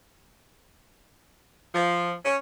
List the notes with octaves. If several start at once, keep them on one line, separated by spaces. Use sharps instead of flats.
F3
C#4